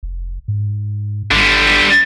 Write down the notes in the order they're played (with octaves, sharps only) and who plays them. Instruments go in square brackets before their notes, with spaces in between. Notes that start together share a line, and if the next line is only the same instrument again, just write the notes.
[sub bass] F1
G#2
[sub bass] G#1 [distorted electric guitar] D3 G3